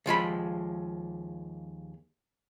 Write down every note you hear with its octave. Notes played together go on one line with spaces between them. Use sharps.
D#2 F3 G#3 B5